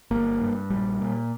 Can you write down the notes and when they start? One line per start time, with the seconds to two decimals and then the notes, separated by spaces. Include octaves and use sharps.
0.11 G1 A#3
0.41 G2
0.70 A#1 G3
1.01 A#2